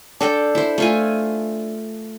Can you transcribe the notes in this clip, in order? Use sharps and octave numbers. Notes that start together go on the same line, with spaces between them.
D4 A4 G5
E4 C5
A3 F4 G#5